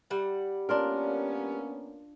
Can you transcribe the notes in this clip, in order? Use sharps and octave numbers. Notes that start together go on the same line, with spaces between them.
G3 F#5
A#3 B3 C#4 D4 F4 A#4